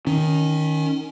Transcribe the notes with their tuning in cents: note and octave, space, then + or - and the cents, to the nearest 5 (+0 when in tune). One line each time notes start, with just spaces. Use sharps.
D#3 +0 C#4 +15